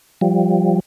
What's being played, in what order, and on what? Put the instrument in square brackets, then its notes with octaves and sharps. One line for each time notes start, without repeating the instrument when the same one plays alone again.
[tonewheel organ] F3 G3